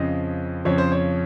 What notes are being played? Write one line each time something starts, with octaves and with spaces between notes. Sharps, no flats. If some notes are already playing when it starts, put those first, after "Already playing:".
Already playing: F2 C#3 F3 D#5
F2 C#3 F3 C#5
C5
C#5